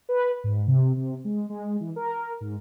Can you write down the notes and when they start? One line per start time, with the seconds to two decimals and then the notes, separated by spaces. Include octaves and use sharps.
0.09 B4
0.44 G#2
0.67 C3
0.96 C3
1.25 G#3
1.50 G#3
1.80 E3
1.96 A#4
2.41 G#2